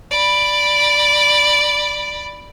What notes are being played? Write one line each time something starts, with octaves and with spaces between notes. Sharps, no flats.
D5 B5